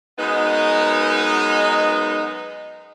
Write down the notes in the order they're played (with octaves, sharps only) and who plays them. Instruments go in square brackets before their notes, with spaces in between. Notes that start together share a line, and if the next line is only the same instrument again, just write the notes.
[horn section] F#2 G#3 B3 D#4